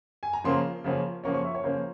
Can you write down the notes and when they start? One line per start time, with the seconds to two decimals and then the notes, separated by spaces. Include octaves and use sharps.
0.23 G#5
0.33 A#5
0.44 C#3 F3 A#3 C#4 C6
0.84 C#3 F3 A#3 C#4
1.24 C#3 F3 A#3 C#4 C#6
1.34 C#6
1.44 E5
1.55 C#5
1.64 C#3 F3 A#3 C#4 C5